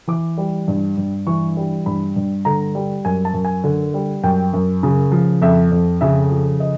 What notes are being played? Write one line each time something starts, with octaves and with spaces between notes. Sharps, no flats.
E3 D6
G3
G2
G2
E3 C#6
G3
G2 B5
G2
D3 A#5
G3
F#2 G#5
A5
F#2
G#5
D3
G3
F#2 G5
F#2
C#3
F3
F2 E5
F2
C#3 E5
F3
D#5